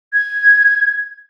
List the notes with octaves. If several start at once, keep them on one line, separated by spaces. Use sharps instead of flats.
G#6